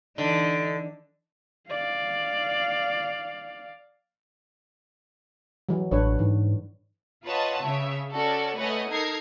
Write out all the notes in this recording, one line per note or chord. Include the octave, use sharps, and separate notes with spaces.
D3 E3 D#4
D5 F5
E3 F#3
A1 D4 B4 C#5
G#2 E3
F4 B4 C#5 D#5 F#5 A5
C#3 C#5 E5
C#4 F#4 A4 D5
A3 B4 C#5 D#5 F#5 G#5
D#4 A4 A#4 A#5 G#6 C7